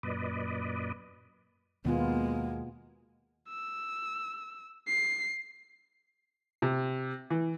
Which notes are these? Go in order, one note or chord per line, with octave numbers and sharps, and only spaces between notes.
F#2 A#2 B4 D5 D#5
D#2 B2 G#3 A#3 B3 F4
E6
C7
C3
E3